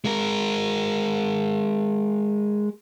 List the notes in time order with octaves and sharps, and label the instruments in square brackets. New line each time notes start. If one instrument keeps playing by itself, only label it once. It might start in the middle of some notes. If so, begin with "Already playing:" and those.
[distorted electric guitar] G#3 A#4